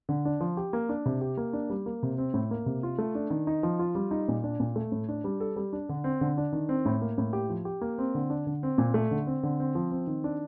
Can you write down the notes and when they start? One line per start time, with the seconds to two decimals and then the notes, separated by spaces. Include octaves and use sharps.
0.09 D3
0.25 D4
0.40 F3
0.57 G4
0.73 A#3
0.89 D4
1.06 C3
1.21 G4
1.37 A#3
1.53 D4
1.70 G3
1.86 A#3
2.03 C3
2.18 C4
2.34 A2
2.51 A#3
2.66 C3
2.83 F4
2.98 A3
3.15 D4
3.30 D#3
3.47 D#4
3.63 F3
3.79 F4
3.95 G3
4.11 D#4
4.28 A#2
4.44 D4
4.60 A#2
4.76 A3
4.92 A2
5.09 D4
5.24 G3
5.40 A4
5.56 G3
5.73 D4
5.89 D3
6.04 C4
6.21 D3
6.38 D4
6.52 D#3
6.69 C4
6.86 A2
7.02 A#3
7.18 A2
7.33 G4
7.49 F3
7.65 G4
7.81 A#3
7.98 C4
8.14 D3
8.30 D4
8.47 D3
8.63 C4
8.78 A#2
8.94 A3
9.11 D3
9.27 C4
9.43 D3
9.60 C4
9.75 F3
9.91 C4
10.07 D#3
10.24 D4